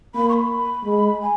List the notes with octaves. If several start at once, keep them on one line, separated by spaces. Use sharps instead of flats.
A#3 B5
C#6
B5
G#3
G#5